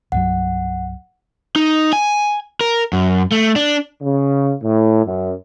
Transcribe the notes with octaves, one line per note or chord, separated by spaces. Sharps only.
C2 G2 F#3 F#5
D#4
G#5
A#4
F#2
A3
D4
C#3
A2
F#2